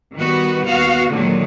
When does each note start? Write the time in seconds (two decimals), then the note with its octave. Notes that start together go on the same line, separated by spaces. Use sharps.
0.16 D#3 G3 B3 F#4 B4
0.64 D#2 B3 F#4 F5
1.11 A#2 D3 D#3 F#3 G#3